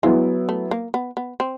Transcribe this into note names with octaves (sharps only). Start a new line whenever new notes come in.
F#3 G#3 B3 E4
A3
A#3
B3
B3
C4